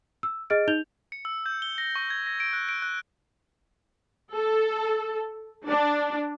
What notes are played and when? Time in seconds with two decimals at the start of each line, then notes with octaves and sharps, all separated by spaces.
0.23 E6
0.50 G#4 D#5 F6 A6 D7
0.68 D#4 G6 F7 G7
1.12 C#7
1.25 E6
1.46 G6
1.62 G7
1.78 A#6
1.95 C#6
2.10 G#6
2.27 A#6
2.40 D7
2.53 F#6
2.69 D7
2.82 F#6
4.32 A4
5.66 D4